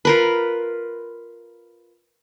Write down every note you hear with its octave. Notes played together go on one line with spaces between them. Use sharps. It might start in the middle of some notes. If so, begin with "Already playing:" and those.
F4 A#4 B4